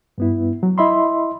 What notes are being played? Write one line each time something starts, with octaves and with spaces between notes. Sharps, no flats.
G2 B3 E4
F#3
E4 D#5 E5 B5 C6